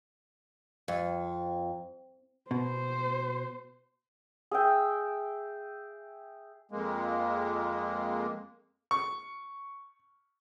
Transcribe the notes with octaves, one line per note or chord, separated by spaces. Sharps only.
F2
B2 C5
G#4 E5 G5
F2 G#3 A#3
C#6